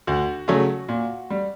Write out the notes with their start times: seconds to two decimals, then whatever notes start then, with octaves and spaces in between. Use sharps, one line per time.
0.07 D2 F#4
0.48 C#3 F#3 A3
0.89 A#2
1.30 G3